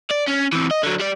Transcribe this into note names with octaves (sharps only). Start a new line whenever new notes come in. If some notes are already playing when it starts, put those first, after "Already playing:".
D5
C#4
E3 C4
D#5
D3 F#3
G3 D5